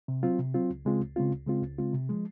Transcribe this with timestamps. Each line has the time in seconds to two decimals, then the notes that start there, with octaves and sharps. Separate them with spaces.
0.08 C3
0.23 F#3 C4 F4
0.39 C3
0.54 F#3 C4 F4
0.70 C#2
0.85 C#3 G#3 C4 F4
1.01 C#2
1.16 C#3 G#3 C4 F4
1.32 C#2
1.47 C#3 G#3 C4 F4
1.63 C#2
1.78 C#3 G#3 C4 F4
1.94 C3
2.09 F3 G#3